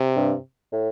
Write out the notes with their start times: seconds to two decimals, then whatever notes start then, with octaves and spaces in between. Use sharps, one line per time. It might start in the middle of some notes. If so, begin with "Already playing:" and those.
Already playing: C3
0.16 G2
0.72 A2